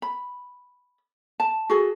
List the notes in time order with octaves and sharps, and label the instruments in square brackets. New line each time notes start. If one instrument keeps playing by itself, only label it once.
[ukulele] B5
A5
F#4 G#4 A4